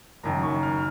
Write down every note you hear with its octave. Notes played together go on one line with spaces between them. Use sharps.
F#1 F#2 D#3 A#5
C#6
F6